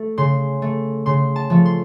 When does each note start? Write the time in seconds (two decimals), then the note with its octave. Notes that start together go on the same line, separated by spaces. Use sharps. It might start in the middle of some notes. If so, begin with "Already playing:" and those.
Already playing: A3
0.18 C#3 C6
0.62 A3
1.06 C#3 C6
1.36 A5
1.50 F3 A3
1.65 C6